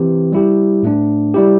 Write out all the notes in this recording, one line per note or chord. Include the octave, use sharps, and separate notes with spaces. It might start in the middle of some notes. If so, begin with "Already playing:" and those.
Already playing: E3 C4 G4
G3 E4 G4
A2 A3 D4
G3 E4 G4